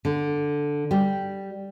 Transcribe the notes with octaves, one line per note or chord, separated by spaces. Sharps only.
D3
G3